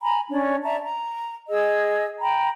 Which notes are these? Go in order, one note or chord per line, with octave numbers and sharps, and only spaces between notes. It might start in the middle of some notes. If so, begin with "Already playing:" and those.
G#5 A#5 B5
C#4 D4 C#5 D5
D5 E5 A5 A#5
A#5
G#4 D#5 E6
G5 A#5 B5